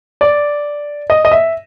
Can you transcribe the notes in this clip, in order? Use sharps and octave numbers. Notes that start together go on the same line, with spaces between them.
D5
D#5
D#5
E5